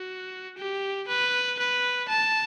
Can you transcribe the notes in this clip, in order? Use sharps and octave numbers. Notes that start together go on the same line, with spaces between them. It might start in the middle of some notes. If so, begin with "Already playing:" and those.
Already playing: F#4
G4
B4
B4
A5